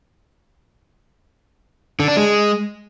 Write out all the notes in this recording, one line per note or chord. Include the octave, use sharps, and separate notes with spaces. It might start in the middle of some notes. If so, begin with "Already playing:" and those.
D3
D4
G#3